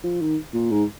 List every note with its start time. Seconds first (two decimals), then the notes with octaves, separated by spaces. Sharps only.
0.04 F3
0.21 D#3
0.54 A#2
0.71 G#2